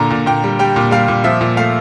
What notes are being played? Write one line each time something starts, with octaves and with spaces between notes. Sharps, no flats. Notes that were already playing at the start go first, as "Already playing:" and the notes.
Already playing: A#2 D3 A#5
A#2
A#2 G5
G3
G3 G5
A#2
G3 F5
A#2
F3 E5
A#2
A3 F5